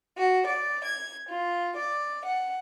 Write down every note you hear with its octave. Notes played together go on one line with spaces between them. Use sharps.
F#4
D5
G#6
F4
D5
F#5